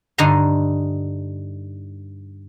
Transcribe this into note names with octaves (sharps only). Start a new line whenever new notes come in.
G2 D3 D#4 A#5 C6